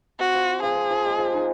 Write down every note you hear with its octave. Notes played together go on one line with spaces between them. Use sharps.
C4 F#4
F3
F4
F3 G#4
C4
F3
G#3
F3
D#4